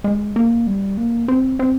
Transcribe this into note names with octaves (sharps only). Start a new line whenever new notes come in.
G#3
A#3
G3
A#3
C4
C4